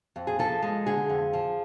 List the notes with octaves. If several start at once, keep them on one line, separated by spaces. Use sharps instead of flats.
F2
G#4
F3 A4
G#3
D3 G#4
F2
F3